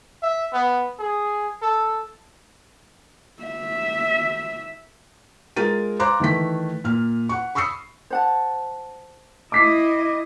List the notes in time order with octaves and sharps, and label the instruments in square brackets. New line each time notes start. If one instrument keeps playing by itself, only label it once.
[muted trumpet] E5
B3
G#4
A4
[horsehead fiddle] E5
[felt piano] G#3 F4 A#4 A6 D#7
C5 F5 A#5 C6 D6 F#6
D#3 E3 A3 B6
A#2 F6
F#5 C#6
B5 C#6 D#6 E6 C7 C#7
[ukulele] C5 F#5 A5
[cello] E4 D#5 [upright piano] D6 B6 C7